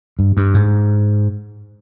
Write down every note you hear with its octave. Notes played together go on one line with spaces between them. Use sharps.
G2
G2
G#2